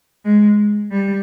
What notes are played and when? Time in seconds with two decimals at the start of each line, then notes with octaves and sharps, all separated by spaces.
0.25 G#3
0.92 G3